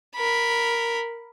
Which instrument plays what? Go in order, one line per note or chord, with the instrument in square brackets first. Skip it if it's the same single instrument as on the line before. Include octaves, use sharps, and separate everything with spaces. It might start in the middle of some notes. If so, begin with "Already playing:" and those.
[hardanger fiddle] A#4 B5